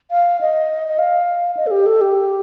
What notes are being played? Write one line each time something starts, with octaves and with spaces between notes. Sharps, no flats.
F5
D#5
D#5
F5
D#5
A4
G4
A4
G4